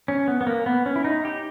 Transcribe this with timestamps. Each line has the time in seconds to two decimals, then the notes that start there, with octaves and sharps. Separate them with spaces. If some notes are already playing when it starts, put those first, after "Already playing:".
0.08 C#4
0.28 B3
0.41 B3
0.47 A#3
0.66 B3
0.86 C#4
0.96 E4
1.04 D#4
1.25 G4